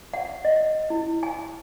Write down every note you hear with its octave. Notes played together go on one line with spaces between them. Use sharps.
F#5
D#5
E4
G#5